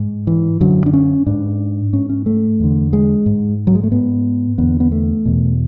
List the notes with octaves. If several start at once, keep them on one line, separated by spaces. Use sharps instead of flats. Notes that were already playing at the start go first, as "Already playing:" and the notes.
Already playing: G#2
E3
F#2 D3 F#3
D4
C#4
G#2 D4
G#2 C#4
C#4
A3
E2 D3
G#3
G#2
F#3
G#3
A3
G#2 B3
E2 D3 B3
B3
A3
E2 B2